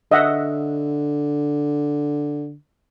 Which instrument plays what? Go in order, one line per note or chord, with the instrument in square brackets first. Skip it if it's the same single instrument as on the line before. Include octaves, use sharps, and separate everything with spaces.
[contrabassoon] D3 [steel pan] D#5 E5 F#5